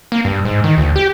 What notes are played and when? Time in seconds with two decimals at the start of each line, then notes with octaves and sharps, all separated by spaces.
0.12 A#3
0.25 G2
0.45 G#2
0.64 D#3
0.78 D2
0.96 G4